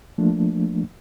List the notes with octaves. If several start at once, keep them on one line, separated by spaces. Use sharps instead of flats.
F3 A3 A#3 D4